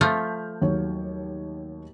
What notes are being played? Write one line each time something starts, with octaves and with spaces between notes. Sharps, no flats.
F3 A3 F6 G6
D#2 F#3 C#5